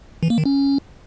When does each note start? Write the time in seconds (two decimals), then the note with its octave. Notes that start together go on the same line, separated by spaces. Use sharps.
0.23 E3
0.30 A#3
0.38 D#3
0.46 C#4